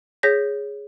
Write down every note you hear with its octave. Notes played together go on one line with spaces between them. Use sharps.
G#4 C#5 G6 A#6 B6